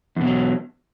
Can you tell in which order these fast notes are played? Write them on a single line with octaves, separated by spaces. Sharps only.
E2 B2 F#3